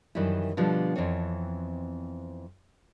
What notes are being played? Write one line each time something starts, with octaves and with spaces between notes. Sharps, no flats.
F#2 D#3 E3 G3 E4
B2 D3 F3 G3
F2 E3 B3 C4 C#5